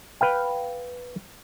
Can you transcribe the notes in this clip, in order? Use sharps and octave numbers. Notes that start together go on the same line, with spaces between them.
B4 F5 G5